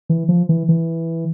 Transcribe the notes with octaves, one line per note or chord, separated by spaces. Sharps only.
E3
F3
E3
E3